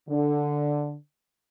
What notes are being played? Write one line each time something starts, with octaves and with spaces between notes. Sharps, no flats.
D3